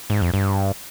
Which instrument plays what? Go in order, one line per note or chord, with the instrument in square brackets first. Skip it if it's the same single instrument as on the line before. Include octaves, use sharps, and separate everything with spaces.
[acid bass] G#2
F2
G2